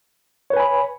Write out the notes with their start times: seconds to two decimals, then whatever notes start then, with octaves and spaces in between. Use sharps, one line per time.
0.50 C#5
0.53 B4
0.57 G#5
0.60 B5